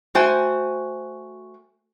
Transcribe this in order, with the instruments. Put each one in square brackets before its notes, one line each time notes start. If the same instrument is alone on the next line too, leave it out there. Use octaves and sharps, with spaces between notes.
[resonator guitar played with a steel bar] A3 F#4 C5 G5 G#5